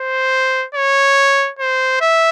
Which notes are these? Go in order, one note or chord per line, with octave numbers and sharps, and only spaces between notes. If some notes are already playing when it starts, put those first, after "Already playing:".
Already playing: C5
C#5
C5
E5